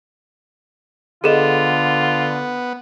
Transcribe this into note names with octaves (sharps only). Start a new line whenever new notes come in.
D3 B3 F4 G#4 A4 D#5